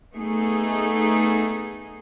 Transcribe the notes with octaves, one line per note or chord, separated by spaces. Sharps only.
A3 B3 D#4 G#4